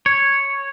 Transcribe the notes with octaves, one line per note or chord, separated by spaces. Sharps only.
C#5